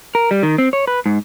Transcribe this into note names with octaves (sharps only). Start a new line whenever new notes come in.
A#4
G3
D#3
C4
C#5
B4
G#2